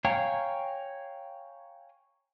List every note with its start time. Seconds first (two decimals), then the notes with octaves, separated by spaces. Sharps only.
0.05 C#5 F5 G5 G#5 A#5